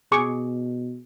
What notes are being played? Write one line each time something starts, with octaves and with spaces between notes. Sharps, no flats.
B2 G#4 C#6 D6